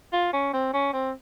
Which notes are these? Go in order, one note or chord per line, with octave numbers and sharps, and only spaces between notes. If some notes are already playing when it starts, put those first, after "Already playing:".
F4
C#4
C4
C#4
C4